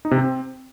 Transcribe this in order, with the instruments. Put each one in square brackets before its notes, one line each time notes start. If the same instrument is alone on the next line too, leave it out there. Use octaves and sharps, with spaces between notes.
[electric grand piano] D#4
C3
C4